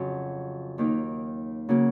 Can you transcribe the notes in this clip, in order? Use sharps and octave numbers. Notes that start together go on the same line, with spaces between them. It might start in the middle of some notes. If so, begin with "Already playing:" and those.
Already playing: F2 C#3 F#3
D#2 D#3 A#3 D#4
C#3 F#3 A#3